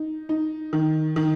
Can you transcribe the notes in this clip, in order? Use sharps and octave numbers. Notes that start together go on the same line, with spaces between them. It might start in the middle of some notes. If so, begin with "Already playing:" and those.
Already playing: D#4
D#4
D#3
D#3